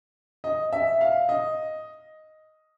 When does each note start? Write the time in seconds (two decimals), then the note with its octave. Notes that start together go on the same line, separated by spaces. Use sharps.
0.44 D#5
0.72 E5
1.01 F5
1.29 D#5